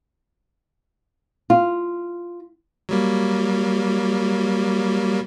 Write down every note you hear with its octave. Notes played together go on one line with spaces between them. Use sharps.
F4
F#3 G3 A#3